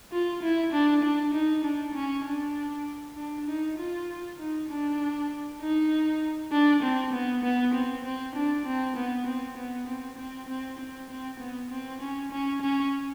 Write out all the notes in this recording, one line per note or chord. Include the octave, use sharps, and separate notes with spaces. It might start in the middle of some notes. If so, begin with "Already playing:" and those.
F4
E4
D4
D4
D#4
D4
C#4
D4
D4
D#4
F4
D#4
D4
D#4
D4
C4
B3
B3
C4
C4
D4
C4
B3
C4
B3
C4
C4
C4
C4
C4
B3
C4
C#4
C#4
C#4